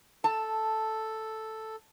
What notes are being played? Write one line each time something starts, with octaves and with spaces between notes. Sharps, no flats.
A4 A5